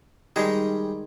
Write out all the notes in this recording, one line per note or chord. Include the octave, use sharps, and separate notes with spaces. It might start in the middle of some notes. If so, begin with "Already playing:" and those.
D#3 G3 G#3 D#4 G#4